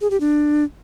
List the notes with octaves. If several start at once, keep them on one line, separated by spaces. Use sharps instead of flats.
G#4
G4
D4